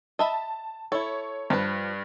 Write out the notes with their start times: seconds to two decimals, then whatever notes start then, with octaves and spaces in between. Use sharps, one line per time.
0.19 D#5 E5 A5 B5
0.92 E4 A4 C#5
1.50 G2 F3 B4